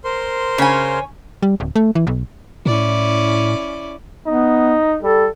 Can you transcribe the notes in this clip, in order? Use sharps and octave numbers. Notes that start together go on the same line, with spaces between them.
A#4 C5 C6
C#3 C#5 G#5
G3
D1
A3
E3
B1
A2 C#4 E4 D5
B3 D#4
G3 A4